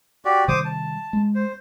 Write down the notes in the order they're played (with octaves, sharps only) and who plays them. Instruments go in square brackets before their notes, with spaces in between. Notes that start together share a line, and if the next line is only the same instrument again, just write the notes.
[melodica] F#4 G4 D5
[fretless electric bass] C3 D#3 G3 [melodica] C5 D6 D#6
[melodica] A5
[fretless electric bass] G#3
[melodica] C5